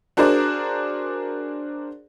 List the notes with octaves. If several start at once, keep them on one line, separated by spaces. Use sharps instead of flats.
D4 F#4 G#4 A#4 C5 D5